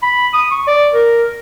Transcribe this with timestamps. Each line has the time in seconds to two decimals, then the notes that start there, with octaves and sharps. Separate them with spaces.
0.03 B5
0.33 D#6
0.51 C#6
0.67 D5
0.94 A#4